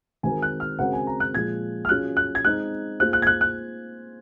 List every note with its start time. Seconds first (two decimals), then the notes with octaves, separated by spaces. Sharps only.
0.23 D#3 G#3 C4 F#4 A#4 G#5
0.42 F#6
0.60 F6
0.79 C#3 G#3 C4 F#4 A#4 F#5
0.93 G#5
1.07 A#5
1.20 F#6
1.34 A#2 F3 G#3 G#6
1.85 F6
1.89 F#3 C#4 F4 G#4 F#6
2.17 F#6
2.35 G#6
2.45 G#3 C4 D#4 F#6
3.00 A#3 F4 G#4 C5 F#6
3.13 F#6
3.22 G#6
3.27 F#6
3.41 F#6